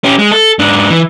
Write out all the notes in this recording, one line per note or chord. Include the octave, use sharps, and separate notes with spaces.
C#4 G4
G#3
A4
G#2 D4
E3